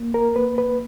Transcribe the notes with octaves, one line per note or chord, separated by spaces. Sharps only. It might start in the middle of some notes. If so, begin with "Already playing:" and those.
Already playing: A#3
A#4
A#3 B4
B4